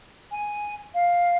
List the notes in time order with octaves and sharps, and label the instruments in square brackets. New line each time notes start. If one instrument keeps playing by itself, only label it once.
[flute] G#5
F5